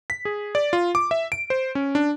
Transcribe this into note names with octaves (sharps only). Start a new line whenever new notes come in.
B6
G#4
D5
F4
D6
E5
D7
C5
C#4
D4